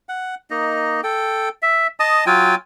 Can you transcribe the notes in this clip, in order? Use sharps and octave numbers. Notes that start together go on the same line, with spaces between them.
F#5
A#3 D#4 D#5
A4 G5
E5
D#5 A5 D#6
F#3 F4 G5 G#5